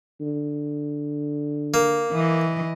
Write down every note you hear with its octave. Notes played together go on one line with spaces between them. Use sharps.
D3
A#3
E3 D#5